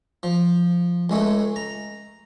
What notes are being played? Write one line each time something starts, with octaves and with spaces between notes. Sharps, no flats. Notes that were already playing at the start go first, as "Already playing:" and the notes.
F3
C#2 G#3 A3
A#5